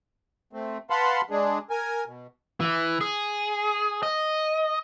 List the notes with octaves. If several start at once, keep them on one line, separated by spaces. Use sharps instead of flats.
A3 C4
B4 F5 F#5 A5 B5 C6
G#3 D4 G#4
A#4 G#5
B2
E3
G#4
D#5